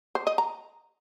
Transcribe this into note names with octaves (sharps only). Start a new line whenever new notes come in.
C5
D#5
A#5